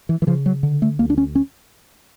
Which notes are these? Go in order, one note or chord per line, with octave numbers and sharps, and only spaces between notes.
E3
E3
C#3 F3
F#3
D3
A3
D2 A#3
D4
C#4
C#4